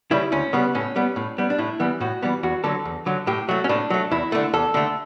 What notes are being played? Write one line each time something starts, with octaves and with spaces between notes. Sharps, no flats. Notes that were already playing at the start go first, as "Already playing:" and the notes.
C#3 G3 E4
D2 C#4
C#3 G3 B3
A2 C#4
G3 B3
A2
G3 B3
D4
A2 E4
E3 G3 B3
A2 F#4
E3 G3 B3
E2 F#4
D3 F#3 A4
E2
D3 F#3
A2 G4
F#3 A3 F#4
C#4
A2 D4
F#3 A3
E2 E4
D3 A3
E2 A4
D3 A3